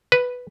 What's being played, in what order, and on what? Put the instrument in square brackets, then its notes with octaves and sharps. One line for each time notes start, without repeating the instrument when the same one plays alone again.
[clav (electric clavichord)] B4